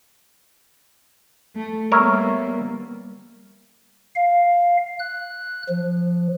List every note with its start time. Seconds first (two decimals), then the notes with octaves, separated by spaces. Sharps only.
1.56 A3
1.92 G3 A#3 B3 A#4 C#5 E5
4.15 F5
4.99 F#6
5.69 F3